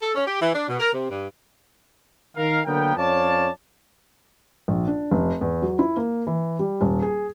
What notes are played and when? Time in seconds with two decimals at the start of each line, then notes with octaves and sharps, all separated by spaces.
0.02 A4
0.15 C#4
0.27 G4
0.41 E3
0.54 D4
0.68 B2
0.80 A#4
0.94 C3
1.10 G2
2.36 D#3 A#4 F5
2.66 D3 F#3 A#3 B3 A#4 G5
2.96 F2 C#4 C#5 D5 F5 A5
4.68 A#1
4.87 D4
5.11 F1
5.41 E2
5.62 F#3
5.79 E4
5.97 A#3
6.27 E3
6.59 G3
6.81 D#1
7.02 G#4